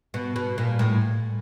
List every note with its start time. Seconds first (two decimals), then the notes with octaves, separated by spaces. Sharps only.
0.14 B2
0.36 B2
0.58 A#2
0.79 A2